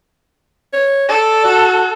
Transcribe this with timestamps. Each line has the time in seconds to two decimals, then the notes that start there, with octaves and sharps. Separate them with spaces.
0.74 C#5
1.09 A4 D5
1.44 F#4